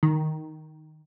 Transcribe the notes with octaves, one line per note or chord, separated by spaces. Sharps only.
D#3